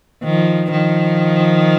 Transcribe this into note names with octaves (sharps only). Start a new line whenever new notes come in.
D#3 F3
D#3 F3